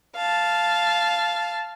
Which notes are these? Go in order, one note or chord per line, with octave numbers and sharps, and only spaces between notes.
F5 A5